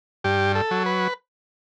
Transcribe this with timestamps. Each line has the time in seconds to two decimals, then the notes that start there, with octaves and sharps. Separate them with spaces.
0.24 G2 G4
0.55 A4
0.71 F#3
0.86 B4